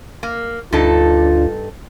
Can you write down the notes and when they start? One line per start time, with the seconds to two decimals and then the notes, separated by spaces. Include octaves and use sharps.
0.23 A#3
0.73 D2 G2 D4 D#4 F4 A4